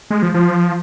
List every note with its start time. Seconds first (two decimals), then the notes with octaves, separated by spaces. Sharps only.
0.10 G#3
0.22 F3
0.34 F3
0.46 F3